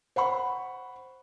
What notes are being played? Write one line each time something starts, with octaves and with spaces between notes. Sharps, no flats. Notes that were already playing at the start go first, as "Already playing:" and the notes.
C5 F#5 B5 C#6